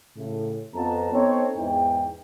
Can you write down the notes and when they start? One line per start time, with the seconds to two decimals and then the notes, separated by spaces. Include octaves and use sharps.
0.17 A2 C#3
0.74 F2 B3 A5 A#5
1.12 B3 C4 D#4 A4 C5 C#5
1.56 E2 G#2 E3 D#4 G5